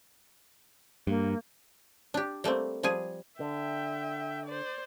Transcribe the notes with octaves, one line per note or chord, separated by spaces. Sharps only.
G2 A#3
D4 G4
G3 A3 A#3 C4
F3 G3 G#4 G#5
D3 E5 G5
C5 D5